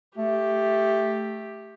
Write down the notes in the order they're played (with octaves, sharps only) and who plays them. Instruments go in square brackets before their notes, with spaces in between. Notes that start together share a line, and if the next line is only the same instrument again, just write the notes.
[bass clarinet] A3 [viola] G4